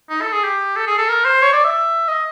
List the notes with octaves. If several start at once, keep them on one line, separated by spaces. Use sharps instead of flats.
D#4
A4
G#4
G4
A4
G#4
A4
A#4
C5
C#5
D5
E5
D#5